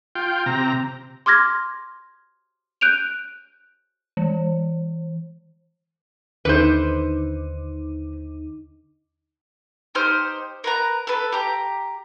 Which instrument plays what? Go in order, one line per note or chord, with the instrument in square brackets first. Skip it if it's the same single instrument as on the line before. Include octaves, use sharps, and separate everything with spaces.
[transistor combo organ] F4 G5
C3 A#5
[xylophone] C6 D6 F6 G#6 A#6
F#6 G6 D7 D#7 F7
[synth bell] E3
[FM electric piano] D#2 D3 D#4 [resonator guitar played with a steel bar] B4 C5
[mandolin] D#4 G4 C5 F6
A#4 B4 A#5
A4 B4
G4 A#5